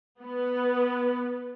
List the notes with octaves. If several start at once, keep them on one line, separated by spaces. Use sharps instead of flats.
B3